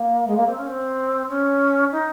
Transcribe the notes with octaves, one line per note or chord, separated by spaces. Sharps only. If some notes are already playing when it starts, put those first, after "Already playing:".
Already playing: A#3
G#3
A#3
C4
C#4
C4
C#4
D#4